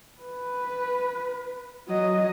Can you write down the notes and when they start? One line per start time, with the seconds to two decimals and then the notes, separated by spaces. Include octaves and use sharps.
0.22 B4
1.89 F#3 D#5